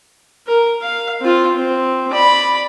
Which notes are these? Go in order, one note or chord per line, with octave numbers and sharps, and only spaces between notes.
A#4
F5
C4 F4
C4
D5 B5